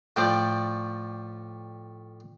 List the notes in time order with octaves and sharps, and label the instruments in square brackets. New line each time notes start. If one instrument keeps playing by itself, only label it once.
[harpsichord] A2 F3 A3 [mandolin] D5 G5